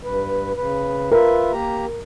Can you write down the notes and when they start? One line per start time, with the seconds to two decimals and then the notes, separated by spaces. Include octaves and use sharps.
0.03 G2 B4
0.56 C#3 B4
1.11 F4 A#4 B4 E5
1.52 A#3 G4 A#5